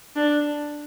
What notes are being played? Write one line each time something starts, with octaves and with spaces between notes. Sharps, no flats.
D4